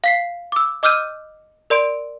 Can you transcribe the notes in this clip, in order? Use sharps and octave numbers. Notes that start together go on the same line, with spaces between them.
F5 B6 C7
D6 E6
D#5 D6 E6 F6 G6 D#7
A#4 D5 C6 D7